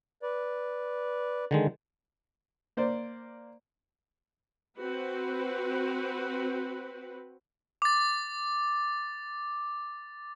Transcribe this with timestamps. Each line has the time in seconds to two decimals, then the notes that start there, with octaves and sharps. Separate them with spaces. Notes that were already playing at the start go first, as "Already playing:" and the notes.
0.22 B4 D5
1.51 D3 D#3 G#3
2.77 A#3 C5 D5
4.78 C4 F#4 B4
7.82 D6 A6